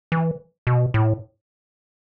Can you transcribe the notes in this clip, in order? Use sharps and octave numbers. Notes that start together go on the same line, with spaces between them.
E3
B2
A2